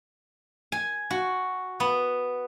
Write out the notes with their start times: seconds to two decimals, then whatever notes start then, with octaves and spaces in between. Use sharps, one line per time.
0.72 G#5
1.10 F#4
1.80 B3